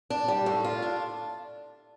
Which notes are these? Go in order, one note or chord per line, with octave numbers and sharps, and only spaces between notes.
D4
G3
A2
F4
D4